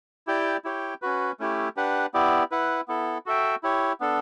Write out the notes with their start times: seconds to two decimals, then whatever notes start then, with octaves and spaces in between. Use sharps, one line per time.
0.27 E4 G4 D5 G5
0.64 E4 G4 C#5 G5
1.02 C#4 F#4 B4
1.40 A3 C#4 E4 G4
1.77 D4 G4 B4 F#5
2.14 B3 E4 G4 D5
2.51 E4 B4 F#5
2.88 B3 E4 A4
3.26 F#4 A4 E5 G5
3.63 E4 G4 C#5
4.00 B3 D4 A4